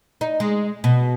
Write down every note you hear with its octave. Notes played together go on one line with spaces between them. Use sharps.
D#4
G#3
B2